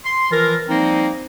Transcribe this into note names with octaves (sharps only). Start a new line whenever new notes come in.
C6
E3 F3 F4 A#4
F3 G3 A#3 C4 D#4